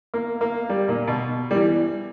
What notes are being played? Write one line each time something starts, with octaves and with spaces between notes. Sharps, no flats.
A#3
A#3
G3
A#2
B2
G3
E3